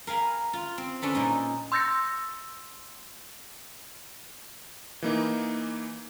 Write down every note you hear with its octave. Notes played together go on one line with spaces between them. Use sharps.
A#4 F5 G#5 B5
F4
C4
C#4 D4 A4 B4
A#2 A#3 D#4
C6 E6 G6 A6 A#6 C#7
E3 A#3 D#4